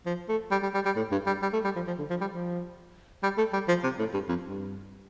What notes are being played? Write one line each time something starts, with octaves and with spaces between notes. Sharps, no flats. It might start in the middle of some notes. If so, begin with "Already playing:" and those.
F3
A3
G3
G3
G3
G3
A2
G2
G3
G3
A3
G3
F3
F3
D3
F3
G3
F3
G3
A3
G3
F3
C3
A2
G2
F2
G2